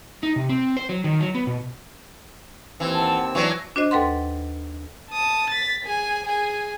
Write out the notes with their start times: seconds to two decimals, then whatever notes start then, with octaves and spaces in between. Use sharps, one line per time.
0.23 D#4
0.36 C3
0.49 C4
0.77 C5
0.89 F#3
1.04 D#3
1.21 F#3
1.35 B3
1.47 B2
2.80 D#2 E3 C4 E6
2.94 F#5 A5
3.35 E3 F#3 D4 C#6
3.76 D4 F#4 C5 D#5
3.91 D#2 A4 B4 F#5 C6
5.11 A5 D#6
5.50 A6 B6
5.85 G#4 G#5
6.26 G#4 G#5